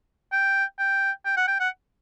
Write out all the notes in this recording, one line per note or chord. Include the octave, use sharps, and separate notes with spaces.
G5
G5
G5
F#5
G5
F#5